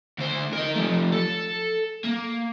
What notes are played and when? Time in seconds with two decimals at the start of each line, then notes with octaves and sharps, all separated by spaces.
0.18 D2 C5
0.53 A#4 D#5
0.76 F3 A3
1.13 A4
2.05 A#3